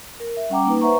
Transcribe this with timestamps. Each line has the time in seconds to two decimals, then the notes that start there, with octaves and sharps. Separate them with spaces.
0.20 A#4
0.37 E5
0.50 G3 C#4 F#5 G5 A#5 D6
0.65 A#3 D#4 B4
0.81 B4 C5 E5 F#5 A#5 C#6